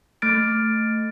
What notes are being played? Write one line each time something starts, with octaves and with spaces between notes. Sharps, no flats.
A3 F6 A6 D7